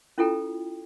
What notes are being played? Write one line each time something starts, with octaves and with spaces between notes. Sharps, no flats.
C#4 E4 F4 A4 G5 A#5